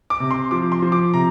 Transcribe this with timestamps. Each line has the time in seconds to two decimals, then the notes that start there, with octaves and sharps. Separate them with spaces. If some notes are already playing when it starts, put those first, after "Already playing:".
0.10 D6
0.20 C3
0.31 C6
0.51 F3 D6
0.72 C6
0.82 F3
0.92 D6
1.13 C3 A#5